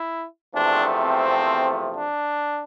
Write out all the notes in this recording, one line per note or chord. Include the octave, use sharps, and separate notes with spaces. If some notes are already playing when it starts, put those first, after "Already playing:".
Already playing: E4
E2 C3 F3 A3 D4
C4
D4